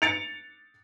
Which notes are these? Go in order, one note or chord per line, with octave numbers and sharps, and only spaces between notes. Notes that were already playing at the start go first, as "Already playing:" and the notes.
A6 C#7 D7 F7